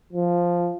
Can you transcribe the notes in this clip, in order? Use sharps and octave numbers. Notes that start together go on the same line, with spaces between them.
F3